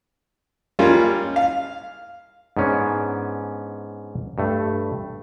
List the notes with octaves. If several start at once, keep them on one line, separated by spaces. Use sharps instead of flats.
G3 G#3 A#3 C#4 F4
F5
G#2 B3 C#4 D4
G2 A3